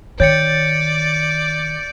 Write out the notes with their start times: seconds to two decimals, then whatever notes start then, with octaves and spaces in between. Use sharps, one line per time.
0.20 D#3 C#5 D5 G5 G6 A6 C#7